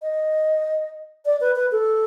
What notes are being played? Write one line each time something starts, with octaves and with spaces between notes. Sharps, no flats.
D#5
D5
B4
B4
A4